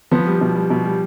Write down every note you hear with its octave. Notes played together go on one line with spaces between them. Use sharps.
F3 B3
G3
B2
G3
B2
G3